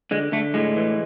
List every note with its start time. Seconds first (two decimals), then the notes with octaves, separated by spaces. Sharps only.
0.11 D3 G#3
0.32 D3 A3
0.54 A2 G#3
0.76 E3